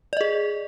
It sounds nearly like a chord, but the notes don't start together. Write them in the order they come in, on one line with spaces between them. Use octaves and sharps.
D5 D#5 G#4